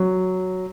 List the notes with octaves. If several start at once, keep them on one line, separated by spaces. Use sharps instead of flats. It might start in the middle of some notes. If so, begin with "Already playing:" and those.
Already playing: F#3